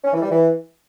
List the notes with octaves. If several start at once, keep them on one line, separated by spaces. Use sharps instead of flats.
C#4
E3
G3
E3